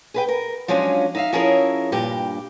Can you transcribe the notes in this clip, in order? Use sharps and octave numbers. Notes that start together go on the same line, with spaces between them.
G#4 B4 G5
A#4
F3 F#3 G#3 C#4 D4 F4
D#4 E5 F5
F3 C#4 E4 G#4 A#4 C#5
G2 A#2 G4